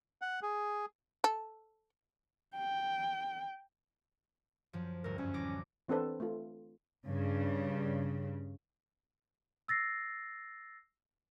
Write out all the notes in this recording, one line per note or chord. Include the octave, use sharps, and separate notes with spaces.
F#5
G#4
A4
G5
F#2 F3
D2 G2 A#4
F#2 C#4
A1 D6 A#6
E3 C4 D4 A4 B4 C5
A3 F4
G2 C#3
E6 A6 A#6 C7